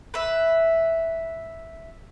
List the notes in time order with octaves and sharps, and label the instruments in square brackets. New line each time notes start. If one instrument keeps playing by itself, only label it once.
[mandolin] B4 E5